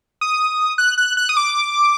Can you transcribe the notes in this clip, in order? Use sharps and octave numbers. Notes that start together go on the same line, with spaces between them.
D#6
F#6
F#6
F#6
D#6
D6